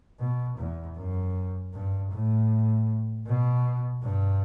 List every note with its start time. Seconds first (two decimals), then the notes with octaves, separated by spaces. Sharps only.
0.20 B2
0.58 E2
0.96 F#2
1.74 G2
2.12 A2
3.26 B2
4.03 G2